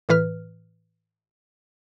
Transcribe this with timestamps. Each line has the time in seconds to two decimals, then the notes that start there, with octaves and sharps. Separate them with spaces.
0.09 A2 E3 B4 F6